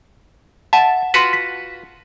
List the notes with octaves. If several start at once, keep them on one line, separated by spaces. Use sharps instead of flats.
E5 F#5 A5
F4 F#4 B4 C6 B6
B6